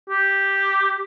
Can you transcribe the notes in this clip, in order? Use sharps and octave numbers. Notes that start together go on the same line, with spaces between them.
G4